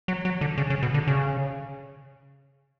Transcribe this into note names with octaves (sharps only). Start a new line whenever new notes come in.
F#3
F#3
D3
C#3
C#3
B2
D3
C#3